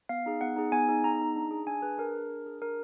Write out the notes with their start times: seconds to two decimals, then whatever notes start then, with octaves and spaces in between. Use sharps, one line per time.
0.09 B3 F5
0.26 D#4 G#4
0.41 B3 F#5
0.56 D#4 G#4
0.72 B3 G#5
0.89 D#4 G#4
1.04 B3 A#5
1.20 D#4 G#4
1.36 D4
1.51 G#4
1.67 D4 G#5
1.82 G#4 B4
1.98 D4 A#4
2.15 G#4
2.30 D4
2.46 G#4
2.62 D4 A#4